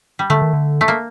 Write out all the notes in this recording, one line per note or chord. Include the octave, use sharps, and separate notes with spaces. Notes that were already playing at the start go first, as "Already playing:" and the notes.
G3
D3 A3
D#3
D3
A3
A#3